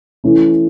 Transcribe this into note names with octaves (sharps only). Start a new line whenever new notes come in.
E3 A3 C#4 E4